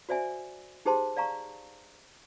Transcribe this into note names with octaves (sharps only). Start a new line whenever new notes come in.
F#4 C5 D5 E5 G#5
D#4 G4 G#4 C5 A5 C6
D5 F5 A#5 C#6